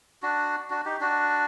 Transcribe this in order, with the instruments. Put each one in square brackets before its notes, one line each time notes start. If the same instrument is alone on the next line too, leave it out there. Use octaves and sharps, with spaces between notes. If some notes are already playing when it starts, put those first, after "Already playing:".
[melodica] D4 F#4
D4 F#4
D#4 G4
D4 F#4